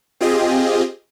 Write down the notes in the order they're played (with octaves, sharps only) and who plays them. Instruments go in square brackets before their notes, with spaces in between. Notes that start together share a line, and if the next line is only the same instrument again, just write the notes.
[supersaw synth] C4 F4 G4 G#4 D#5